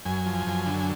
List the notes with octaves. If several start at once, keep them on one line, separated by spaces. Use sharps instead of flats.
F#2 G#5
F3
F#2
D3
G#5